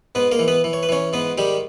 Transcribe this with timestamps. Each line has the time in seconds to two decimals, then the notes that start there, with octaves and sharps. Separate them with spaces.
0.15 G#2 B3 B4
0.31 A#3 A#4
0.39 E3
0.48 B3 B4
0.64 E3
0.73 C#5
0.83 B4
0.89 E3 C#4 C#5
1.13 G#2 B3 B4
1.38 D#3 G3 G4